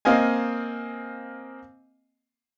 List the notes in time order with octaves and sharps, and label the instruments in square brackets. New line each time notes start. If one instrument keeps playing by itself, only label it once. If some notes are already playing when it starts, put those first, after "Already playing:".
[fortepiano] A#3 C4 D#5 F5 G#5